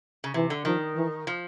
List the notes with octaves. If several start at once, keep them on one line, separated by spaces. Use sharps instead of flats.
C#3
C3 E3
D3
D#3 F3
E3
F3